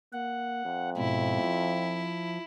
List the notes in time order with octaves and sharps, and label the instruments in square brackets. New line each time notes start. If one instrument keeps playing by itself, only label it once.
[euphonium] A#3 [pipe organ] F#5
[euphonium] F2
[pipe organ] G#2 B2 [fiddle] E4
[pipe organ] F3